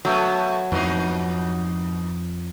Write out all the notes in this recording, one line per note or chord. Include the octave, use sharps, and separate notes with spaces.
F#3 A3 B3
F2 G#2 F3 B3 D#4